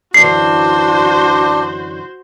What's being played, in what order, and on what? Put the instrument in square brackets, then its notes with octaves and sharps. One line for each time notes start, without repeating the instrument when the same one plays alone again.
[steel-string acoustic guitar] F#2 D3 E3 [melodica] D4 [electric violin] F#4 C5 [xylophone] C7